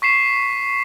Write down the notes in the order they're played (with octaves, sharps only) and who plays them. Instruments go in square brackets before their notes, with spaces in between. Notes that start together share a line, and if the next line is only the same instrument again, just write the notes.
[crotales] C#6 B6 C7 E7